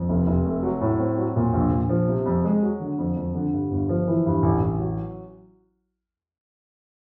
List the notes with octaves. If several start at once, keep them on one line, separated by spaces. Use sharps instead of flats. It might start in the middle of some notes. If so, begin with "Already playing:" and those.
Already playing: F2
F1
F1
A3
F#3
A2
C4
F#3
A#2
A#1
A#1
F3
C3
F2
G#3
F#3
D3
F2
F2
D3
G2
G1
F3
E3
G2
A1
A1
F#3